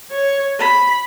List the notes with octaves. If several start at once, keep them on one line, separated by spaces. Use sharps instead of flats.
C#5
B5